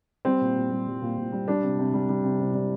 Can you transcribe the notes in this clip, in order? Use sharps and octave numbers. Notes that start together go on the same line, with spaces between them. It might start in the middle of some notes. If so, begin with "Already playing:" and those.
G3 C4
A#2
A#2
G3
G3
A#2
A#2
G3
G3 D4
C3
C3
G3
G3
C3
C3
G3